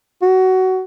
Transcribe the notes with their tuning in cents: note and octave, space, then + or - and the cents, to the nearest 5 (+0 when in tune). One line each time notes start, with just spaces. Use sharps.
F#4 +20